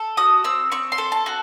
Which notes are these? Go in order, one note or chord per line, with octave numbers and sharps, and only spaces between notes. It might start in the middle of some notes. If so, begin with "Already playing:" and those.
Already playing: A4
F#4 D#6
C4 E6
C4 C#6
C6
A4
A5
F#4